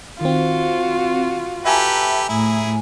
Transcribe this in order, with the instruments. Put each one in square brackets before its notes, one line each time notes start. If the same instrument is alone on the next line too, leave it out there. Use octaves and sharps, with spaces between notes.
[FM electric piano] D#3 C4 [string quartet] F4 F#4
[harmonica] G4 A4 B4 [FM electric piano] E5 G#5 A#5
[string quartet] A2 [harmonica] E4 G#4